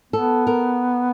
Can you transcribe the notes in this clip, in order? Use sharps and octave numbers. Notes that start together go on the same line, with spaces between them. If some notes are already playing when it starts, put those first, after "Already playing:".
B3 A4
A#4